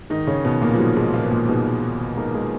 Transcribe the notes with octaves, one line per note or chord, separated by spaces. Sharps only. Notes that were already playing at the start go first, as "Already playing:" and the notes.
G#2 D#3 D#4
C#3 C#4
B2 D#3 B3
A#2 A#3
F3
G#2 F#3
G#2 G#3
A#2 D#3 A#3
B3
A#2 A#3
G#2 B2 B3
D#3
G#2 A#3 A#4
G#3 G#4